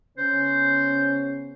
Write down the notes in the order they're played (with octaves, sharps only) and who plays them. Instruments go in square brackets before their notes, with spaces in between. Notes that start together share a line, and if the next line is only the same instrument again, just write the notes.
[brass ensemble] C#3 B3 C#4 [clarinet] C5